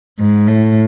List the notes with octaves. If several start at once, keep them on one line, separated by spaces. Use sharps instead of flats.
G#2
A2